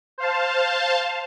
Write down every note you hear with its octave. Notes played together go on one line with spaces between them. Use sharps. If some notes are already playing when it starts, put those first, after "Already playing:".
C5 F5 A5